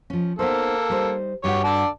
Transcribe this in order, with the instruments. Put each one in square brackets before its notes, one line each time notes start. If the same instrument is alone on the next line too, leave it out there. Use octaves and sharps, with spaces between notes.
[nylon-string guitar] F3 C#4
[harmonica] A#3 A4 [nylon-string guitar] B3 D#4 C5
[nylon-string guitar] G3 D#4 C5
[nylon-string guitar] G2 F#4 F#5 [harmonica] G4 C#5
[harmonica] D3 D5 A5